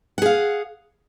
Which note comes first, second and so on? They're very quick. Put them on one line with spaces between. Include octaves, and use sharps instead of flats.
F#5 G#4 F5